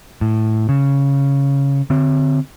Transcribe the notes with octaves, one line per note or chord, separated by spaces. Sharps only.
A2
C#3
D3 C4